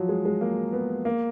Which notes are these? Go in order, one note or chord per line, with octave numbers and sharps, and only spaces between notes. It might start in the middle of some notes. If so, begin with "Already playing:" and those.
Already playing: F3 F#3
G#3
G#3
A#3
B3
A#3